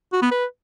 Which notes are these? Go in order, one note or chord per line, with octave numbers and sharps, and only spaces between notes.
F#4
B3
B4